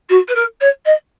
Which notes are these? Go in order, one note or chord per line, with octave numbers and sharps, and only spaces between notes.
F#4
B4
A#4
C#5
D#5